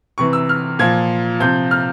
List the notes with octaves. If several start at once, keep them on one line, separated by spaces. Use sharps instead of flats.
C3 E3 C#6
E6
F6
A#2 F3 G#6
C3 F3 G6
F6